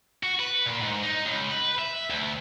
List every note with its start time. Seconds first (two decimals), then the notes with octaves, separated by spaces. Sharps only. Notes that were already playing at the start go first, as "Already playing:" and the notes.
0.23 F#4
0.40 B4
0.66 A#2
0.82 G#2
1.03 D#4
1.27 C#2
1.50 B4
1.79 E5
2.10 D2